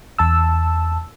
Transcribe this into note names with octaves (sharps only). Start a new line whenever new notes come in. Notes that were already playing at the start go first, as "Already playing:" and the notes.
E2 A5 E6